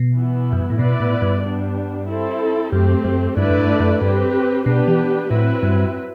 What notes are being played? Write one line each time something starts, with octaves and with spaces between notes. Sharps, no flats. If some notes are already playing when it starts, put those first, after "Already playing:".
Already playing: B2
E3 B3 E4
F#2
G2
A2
B2 B3 E4 B4 D5
A2
G2
G3 B3 D4
C4 E4 A4
F#2 A3 C4 G4
F#2
G2 D3 A3 E4 B4 D5
F#2
G2
F#2
G2 C4 G4 B4
B2 B3 D4 G4 B4
E3
A2 F#3 C4 E4 B4
G2